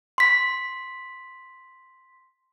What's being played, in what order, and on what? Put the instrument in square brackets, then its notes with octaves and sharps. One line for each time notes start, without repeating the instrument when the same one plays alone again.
[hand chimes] C6 B6